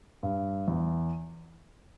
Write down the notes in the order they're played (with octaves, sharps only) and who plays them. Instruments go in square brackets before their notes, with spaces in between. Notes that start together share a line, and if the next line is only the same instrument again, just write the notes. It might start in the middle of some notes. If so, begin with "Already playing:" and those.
[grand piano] G2
E2